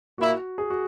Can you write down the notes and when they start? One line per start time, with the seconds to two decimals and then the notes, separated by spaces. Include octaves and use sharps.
0.18 A#2 A#3 E4 F#4
0.58 G#4
0.70 F#4